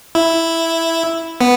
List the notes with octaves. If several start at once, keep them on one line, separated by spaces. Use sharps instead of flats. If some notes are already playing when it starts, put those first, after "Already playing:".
E4
B3